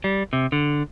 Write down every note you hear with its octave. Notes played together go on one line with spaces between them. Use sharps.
G3
C3
D3